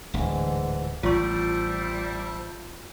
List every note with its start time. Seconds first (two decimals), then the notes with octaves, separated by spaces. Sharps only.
0.14 D1 D2 G#2 D3 E3
1.03 A1 G3 F4 C5 E5 A5 C#6